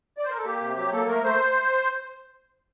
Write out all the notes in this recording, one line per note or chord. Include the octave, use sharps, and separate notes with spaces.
D5
C5
A#4
A4
A#3 G4
C3
F#3 G4
A#3 A4
A3 A#4
A3 C5